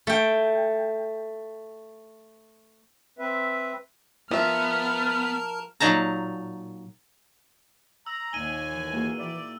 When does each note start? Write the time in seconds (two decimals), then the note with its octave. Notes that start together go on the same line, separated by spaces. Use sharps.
0.07 A3 G5
3.19 C4 B4 E5
4.31 F3 B3 A#4 E5 A5 A#5 F6
5.80 A#2 F#3 D#4 A5 A#5
8.06 A#5 E6
8.33 D#2 A#2 D#4 G#5 D#7 G7
8.72 E3
8.92 A#3 F#4 G#4
9.19 E4 D5 G5